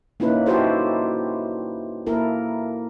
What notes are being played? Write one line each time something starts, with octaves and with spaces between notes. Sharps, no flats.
A#3 C#4 D#4 E4 B4
D#4 E4 F#4 G4 A4 C5
A#3 E4 A4 A#4